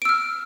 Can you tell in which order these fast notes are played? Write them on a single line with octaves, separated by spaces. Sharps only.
D7 E6 F6